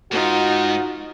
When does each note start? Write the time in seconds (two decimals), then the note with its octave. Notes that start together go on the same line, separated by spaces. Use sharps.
0.12 G#2 D#4 F4 F#4